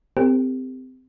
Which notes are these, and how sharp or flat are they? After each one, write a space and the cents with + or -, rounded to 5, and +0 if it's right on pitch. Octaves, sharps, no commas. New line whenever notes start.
C4 -25 G4 +25 A#4 -45